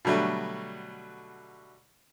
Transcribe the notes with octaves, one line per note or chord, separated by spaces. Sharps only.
B2 D3 F#3 G3 A3